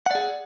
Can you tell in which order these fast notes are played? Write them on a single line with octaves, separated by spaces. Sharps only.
F#5 D5 G#4